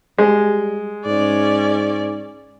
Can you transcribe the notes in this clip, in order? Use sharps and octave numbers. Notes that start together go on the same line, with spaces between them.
G3 G#3
G#2 C#4 D5